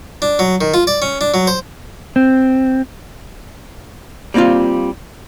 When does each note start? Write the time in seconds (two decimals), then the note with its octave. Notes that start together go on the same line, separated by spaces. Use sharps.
0.22 D4
0.39 F#3
0.61 D#3
0.74 F4
0.87 D5
1.02 C#4
1.21 D4
1.34 F#3
1.47 C5
2.16 C4
4.34 G3 A#3 C4 D#4 F4